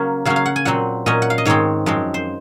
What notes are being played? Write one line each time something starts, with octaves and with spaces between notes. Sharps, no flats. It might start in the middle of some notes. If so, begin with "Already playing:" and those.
Already playing: C#3 F#3 A#3 C#4
C#3 F#3 A#3 C#4 F5
F5
F#5
G#5
A#2 F#3 C4 F#5
A#2 F#3 C#4 D#5
F#5
F5
D#5
G#2 D#3 G#3 C4 C#5
F#2 F3 G#3 C4
C5